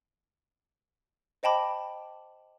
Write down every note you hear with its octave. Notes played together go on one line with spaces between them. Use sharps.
C5 D#5 G5 A5 B5 D6